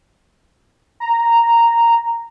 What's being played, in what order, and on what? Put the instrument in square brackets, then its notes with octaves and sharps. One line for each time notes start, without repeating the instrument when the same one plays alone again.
[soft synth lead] A#5